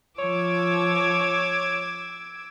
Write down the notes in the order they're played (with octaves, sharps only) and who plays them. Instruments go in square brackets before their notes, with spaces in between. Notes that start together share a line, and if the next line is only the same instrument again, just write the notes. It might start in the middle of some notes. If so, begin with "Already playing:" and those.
[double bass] F3 [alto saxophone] C#5 [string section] D6 E6 G#6